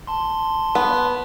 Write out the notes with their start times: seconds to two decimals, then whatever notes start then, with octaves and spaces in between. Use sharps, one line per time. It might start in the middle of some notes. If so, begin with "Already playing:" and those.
0.07 A5 C6
0.75 B3